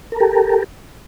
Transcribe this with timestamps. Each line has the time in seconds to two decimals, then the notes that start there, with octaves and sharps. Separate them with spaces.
0.12 A#4
0.16 A4
0.20 G4